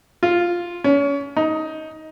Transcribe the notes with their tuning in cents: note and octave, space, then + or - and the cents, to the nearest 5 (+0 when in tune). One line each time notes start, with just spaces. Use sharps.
F4 +0
C#4 +30
D#4 +15